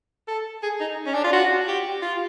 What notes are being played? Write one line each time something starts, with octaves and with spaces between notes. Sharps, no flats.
A4
G#4
D#4
C#4
D4
F4
F#4
G4
F4